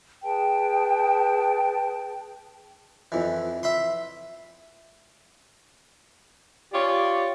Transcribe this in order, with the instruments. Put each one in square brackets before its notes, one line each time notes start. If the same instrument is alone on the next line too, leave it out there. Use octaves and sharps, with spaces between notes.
[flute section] G#4 B4 G5 A5
[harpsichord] F2 E3
E5 B5 C6
[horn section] F4 G4 C#5 D5